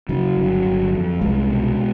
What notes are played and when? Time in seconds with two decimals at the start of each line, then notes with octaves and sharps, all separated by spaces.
0.09 C#3 F#3
0.37 G1
0.65 G1
0.93 F2
1.21 C2 G#3
1.49 B2